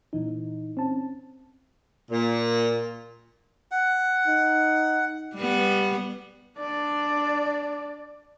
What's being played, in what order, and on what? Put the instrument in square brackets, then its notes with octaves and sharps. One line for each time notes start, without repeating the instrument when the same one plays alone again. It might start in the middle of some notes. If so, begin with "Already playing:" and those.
[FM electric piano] A#2 E3 D#4
C4 C#4 A5
[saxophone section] A#2
[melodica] F#5
[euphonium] D#4
[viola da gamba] G3 B3
[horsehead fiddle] D4 D5